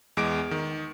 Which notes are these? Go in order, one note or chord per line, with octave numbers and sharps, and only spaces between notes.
E2 G#3 D6 D7
D#3